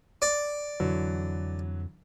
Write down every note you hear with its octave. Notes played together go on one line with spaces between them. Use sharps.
D5
F2 D3 E3 F#3